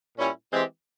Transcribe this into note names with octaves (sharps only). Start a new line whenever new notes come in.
A#2 G3 C#4 E4
E3 G#3 C4 G4